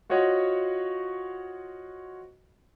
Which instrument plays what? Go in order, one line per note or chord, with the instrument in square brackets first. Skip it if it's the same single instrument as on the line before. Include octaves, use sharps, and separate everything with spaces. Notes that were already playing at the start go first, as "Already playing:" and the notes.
[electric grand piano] F4 F#4 C5 C#5 D#5 F#5